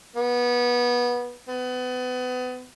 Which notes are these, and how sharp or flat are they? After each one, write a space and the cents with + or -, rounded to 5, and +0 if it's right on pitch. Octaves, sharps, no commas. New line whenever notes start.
B3 -20
B3 +30